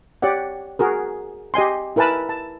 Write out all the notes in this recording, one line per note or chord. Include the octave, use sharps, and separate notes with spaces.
G4 C#5 D5 F#5
F#4 G#4 A#4
G4 D#5 G#5 C6
E4 A#4 B4 G#5 A5 B5
A5